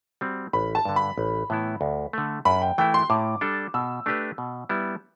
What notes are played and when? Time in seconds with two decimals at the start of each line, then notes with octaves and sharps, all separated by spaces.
0.21 G3 C4 F#4
0.53 A1 B5
0.75 A5
0.85 G2 D3
0.96 B5
1.18 A1
1.50 A2 E3 B3 E4
1.81 D2
2.13 D3 A3
2.45 F#2 B5
2.62 G5
2.78 E3 A3 E4 G5
2.94 C6
3.10 A2 D6
3.41 G3 D4 A4
3.74 B2 E6
4.06 A3 D4 G4 B4
4.38 B2
4.69 G3 B3 E4